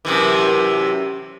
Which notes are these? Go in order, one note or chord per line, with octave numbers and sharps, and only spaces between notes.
F#2 C3 E3